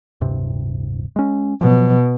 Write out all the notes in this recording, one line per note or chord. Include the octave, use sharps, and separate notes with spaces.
D1 G2 C3
G#3 C#4
B2 F3 F#3